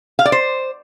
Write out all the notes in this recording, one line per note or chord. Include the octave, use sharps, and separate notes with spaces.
F5
D5
C5